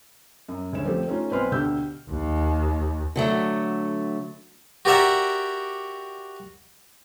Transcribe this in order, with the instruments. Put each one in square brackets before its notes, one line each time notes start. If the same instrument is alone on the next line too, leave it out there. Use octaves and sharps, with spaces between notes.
[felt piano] F#2
D#1 D2 G#3 C#4 C#5 E7
F3 A3 C4 G4 A4
A3 C#4 D#4 F4
B1 C4 B4 G#5 C6 F6
D2 B2 D3 G4 E6 G6
[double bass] D#2
[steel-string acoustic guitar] D3 F#3 A3
[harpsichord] F#4 G4 A#4 D5 E5 F#5